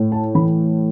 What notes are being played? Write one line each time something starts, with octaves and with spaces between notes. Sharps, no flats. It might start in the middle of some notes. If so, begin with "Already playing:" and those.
Already playing: A2
A5
E3 B5